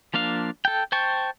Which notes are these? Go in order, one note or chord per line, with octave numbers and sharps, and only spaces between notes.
F3 A#3 D4 F5
A4 G5
C5 G5 A5 C#6